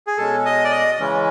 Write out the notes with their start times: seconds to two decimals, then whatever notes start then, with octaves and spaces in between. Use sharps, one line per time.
0.07 G#4
0.17 B2 G#3 C#4 A4
0.45 D#5
0.64 D5
0.72 D#5
0.99 C#3 E3 G#3 C#4